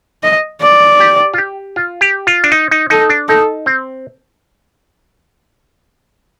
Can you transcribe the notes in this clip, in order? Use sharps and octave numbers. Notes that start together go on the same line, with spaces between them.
D#5
D5
G4
F4
G4
F4
G4
F4
D4
D#4
D#4
D#4 A4
D4
D#4 A4
C4